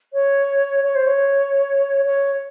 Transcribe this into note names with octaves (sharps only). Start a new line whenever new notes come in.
C#5
C#5
C5
C#5
C#5